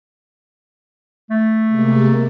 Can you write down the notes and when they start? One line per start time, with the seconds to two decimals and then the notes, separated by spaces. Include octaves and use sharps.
1.30 A3
1.67 C3 G#3 A#3